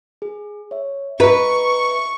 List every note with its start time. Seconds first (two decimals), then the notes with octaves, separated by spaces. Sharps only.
0.22 G#4
0.71 C#5 E5
1.20 B4 D#5 E5 A#5 C#6